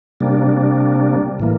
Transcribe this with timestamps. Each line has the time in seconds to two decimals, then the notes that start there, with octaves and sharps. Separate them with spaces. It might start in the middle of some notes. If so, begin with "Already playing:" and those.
0.21 C3 G3 A#3 D4
1.40 A2 E3 A#3